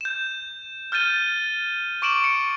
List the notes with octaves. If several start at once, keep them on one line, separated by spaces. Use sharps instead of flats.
G6 E7
F6 G6 A6 D#7 G7
C#6 D6 D7 E7 F#7
C#7